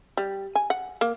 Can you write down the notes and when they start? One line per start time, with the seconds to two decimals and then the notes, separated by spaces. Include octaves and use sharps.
0.17 G3
0.55 G#5
0.70 F#5
1.01 A#3